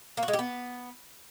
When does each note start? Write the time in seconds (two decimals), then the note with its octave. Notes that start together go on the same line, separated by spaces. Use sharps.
0.17 A#3
0.23 F#4
0.28 G#3
0.33 G4
0.39 B3